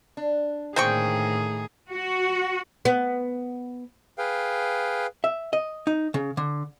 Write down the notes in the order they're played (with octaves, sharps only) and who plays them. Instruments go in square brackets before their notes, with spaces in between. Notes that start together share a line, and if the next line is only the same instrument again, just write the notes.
[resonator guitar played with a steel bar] D4
[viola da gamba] A2 D#3 G#4 [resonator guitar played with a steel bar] D3 A#3 [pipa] C4 G5 C#6
[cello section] F#4
[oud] B3
[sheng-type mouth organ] G#4 B4 F5 G5
[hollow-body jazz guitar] E5
D#5
D#4
C#3
D3